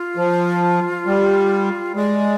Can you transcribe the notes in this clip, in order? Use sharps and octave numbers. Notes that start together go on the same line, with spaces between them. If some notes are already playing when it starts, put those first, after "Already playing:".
Already playing: F4
F3
G3
G#3 D5